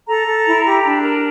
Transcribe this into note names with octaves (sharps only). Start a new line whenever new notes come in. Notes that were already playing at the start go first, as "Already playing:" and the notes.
A4 A#5
A4
E4
G4
D4
A#4